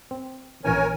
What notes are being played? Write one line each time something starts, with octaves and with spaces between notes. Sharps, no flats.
C4
A#1 E3 C#4 A#4 C#5 G#5